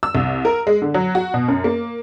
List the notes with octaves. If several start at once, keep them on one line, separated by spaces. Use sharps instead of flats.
E6
C2
A#4
G#3
D3
F#3
F#4
B2
F#2
A#3